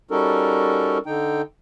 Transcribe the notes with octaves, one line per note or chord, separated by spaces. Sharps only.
G3 C#4 D#4 F#4 A4 A#4
D3 D#4 G5